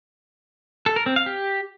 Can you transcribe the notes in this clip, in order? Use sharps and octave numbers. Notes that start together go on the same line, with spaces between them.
A4
A#4
C4
F5
G4